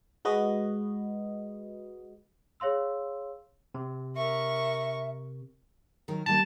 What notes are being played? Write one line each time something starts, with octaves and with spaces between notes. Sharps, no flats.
G#3 F#4 B4 D#5
G#4 C#5 F5 C6 E6
C3
A#4 E5 C#6
D#3 F#3 A#4
D#3 G3 A#3 A5